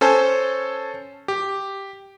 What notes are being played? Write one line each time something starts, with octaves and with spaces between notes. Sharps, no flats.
C#4 A4 C5 G#5 A5
G4